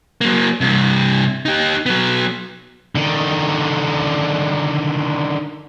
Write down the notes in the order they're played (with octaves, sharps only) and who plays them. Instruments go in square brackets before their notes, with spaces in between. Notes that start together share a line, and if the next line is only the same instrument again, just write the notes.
[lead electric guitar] F#3 A#3
G2 C3
D#4 G4
F#3 B3
[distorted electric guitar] D3 D#3